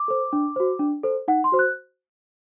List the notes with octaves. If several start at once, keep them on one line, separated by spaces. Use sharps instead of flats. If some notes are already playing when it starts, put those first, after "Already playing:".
Already playing: D6
A4 C5
D4
F#4 C5
D4
A4 C5
D#4 F#5
C6
F#4 C5
F#6